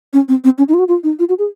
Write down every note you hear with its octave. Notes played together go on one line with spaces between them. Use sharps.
C#4
C4
C4
C#4
D#4
F4
F#4
F4
D#4
F4
F#4
G#4